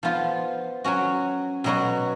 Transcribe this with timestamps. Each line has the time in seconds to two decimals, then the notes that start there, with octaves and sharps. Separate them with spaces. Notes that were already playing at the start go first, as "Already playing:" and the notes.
0.03 F3 B3 F4
0.84 F#3 C#4 F#4
1.64 B2 F#3 B3 F#4